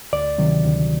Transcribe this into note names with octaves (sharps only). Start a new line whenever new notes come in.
D2 D5
C3 D#3 F#3
D2